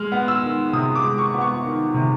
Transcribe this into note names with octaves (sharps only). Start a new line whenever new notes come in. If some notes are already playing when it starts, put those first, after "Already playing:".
Already playing: G#3 F6
B3
E6
D#3
C3 D#6
D6
G#3
C#6
B3
C#6
D#3
C3